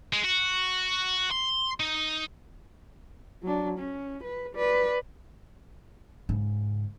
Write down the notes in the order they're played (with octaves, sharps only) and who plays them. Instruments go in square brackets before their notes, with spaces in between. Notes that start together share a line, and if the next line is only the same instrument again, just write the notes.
[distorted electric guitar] G#3
F#4
C6
D#4
[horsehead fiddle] F#3 D4
C#4
B4
B4 D5
[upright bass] G#2 C#3